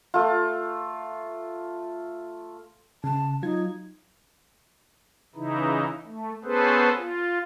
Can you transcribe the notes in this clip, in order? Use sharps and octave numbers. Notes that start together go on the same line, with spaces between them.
A3 F4
C#3 A5
F#3 D#4 F4 G#6
C#3 E3 D#4 E4
A3
B3 C#4 G#4 A4 B4 C5
F4